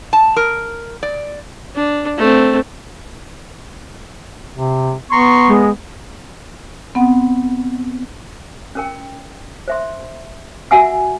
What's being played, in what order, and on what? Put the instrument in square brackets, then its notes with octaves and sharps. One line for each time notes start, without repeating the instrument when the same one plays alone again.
[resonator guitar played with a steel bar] A5
A#4
D5
[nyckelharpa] D4
A3 C4
[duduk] C3
[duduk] B3 [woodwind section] A#5 C6 C#6
[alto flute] G#3
[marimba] B3 C4 F#5
[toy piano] C#4 A#4 G5
C5 E5 C6
F#4 E5 F#5 G#5 E6